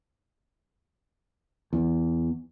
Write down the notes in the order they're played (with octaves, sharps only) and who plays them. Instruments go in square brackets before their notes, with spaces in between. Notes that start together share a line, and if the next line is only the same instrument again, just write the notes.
[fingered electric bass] E2